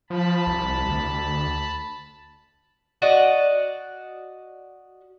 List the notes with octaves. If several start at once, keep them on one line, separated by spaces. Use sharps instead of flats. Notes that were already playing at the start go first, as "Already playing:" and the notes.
F3 A5 B5
C2
D2
F#4 D5 D#5